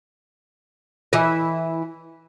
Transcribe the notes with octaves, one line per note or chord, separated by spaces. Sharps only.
E3 E4 D#5